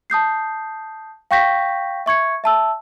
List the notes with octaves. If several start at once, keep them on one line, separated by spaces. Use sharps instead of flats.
A5 D#6 G6 C7
F5 G5 C#6 G6 A#6 B6
E5 C#6 G#6 C#7
E5 A5 E6